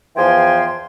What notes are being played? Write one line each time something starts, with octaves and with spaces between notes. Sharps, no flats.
E2 E3 F3 G5 G#5 C6